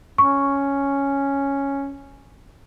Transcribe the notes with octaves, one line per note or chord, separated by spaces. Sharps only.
C#4 C#6